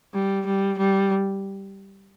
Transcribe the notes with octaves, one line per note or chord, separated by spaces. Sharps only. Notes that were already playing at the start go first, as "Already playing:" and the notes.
G3
G3
G3